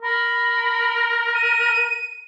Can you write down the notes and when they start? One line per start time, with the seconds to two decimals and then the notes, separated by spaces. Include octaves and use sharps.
0.03 A#4 B5
1.34 D#7